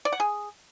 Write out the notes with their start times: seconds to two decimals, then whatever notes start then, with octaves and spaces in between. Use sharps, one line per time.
0.05 D5
0.12 F#5
0.20 G#4